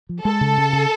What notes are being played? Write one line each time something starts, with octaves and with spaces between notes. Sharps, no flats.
F3
G#3 A4
C#3
C#3
C#3